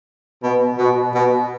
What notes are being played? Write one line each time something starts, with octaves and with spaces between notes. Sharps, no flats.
B2
B2
B2